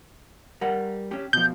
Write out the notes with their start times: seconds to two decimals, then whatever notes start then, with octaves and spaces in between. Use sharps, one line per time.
0.61 G3 A#4 F#5
1.11 C#4 G4
1.33 B2 F3 G6